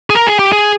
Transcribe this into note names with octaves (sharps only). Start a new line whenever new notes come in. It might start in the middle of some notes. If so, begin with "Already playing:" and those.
G#4
A#4
G#4
G4
G#4